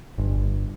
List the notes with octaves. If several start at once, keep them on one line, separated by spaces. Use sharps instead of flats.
G1